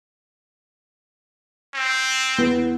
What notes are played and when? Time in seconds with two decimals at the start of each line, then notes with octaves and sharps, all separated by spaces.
1.75 C4
2.38 E2 B3